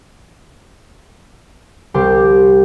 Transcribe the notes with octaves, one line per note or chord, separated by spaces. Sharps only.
C2 G4 C5